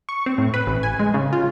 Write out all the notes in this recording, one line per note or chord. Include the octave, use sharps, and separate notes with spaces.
C#6
C4
A2
B4
A1
G#5
G#3
C#3
F4